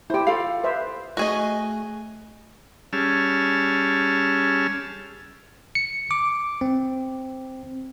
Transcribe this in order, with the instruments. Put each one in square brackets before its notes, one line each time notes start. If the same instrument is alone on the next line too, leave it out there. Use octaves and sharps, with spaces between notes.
[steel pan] E4 G4 [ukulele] C5 G5
[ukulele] F4 A4 F5
[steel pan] B4 C5 E5
[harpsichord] A3 [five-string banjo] F#4 G#4 D#5
[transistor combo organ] G3 C#4 G#4 A5 E6 F6
[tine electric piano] C#7
D6
C4